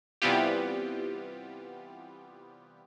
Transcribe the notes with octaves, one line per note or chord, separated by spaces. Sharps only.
C3 E3 G3 B3 F4 G4